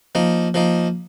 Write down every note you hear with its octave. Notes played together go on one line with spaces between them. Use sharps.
F3 A#3 D#4
F3 A#3 D#4